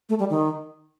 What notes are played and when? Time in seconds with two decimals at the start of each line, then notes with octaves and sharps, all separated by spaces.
0.09 A3
0.19 G3
0.30 D#3